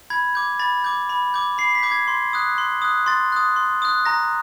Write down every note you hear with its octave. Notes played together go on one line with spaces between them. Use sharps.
B5 G#6
D6 G6
B5 A6
D6 G6
B5
D6 G6
B5 C7
B6
D6 G6
G#6
C6
D#6 F#6
C6
D#6 F#6
C6 A6
D#6 F#6
C6
D#6 F#6
A#5 A#6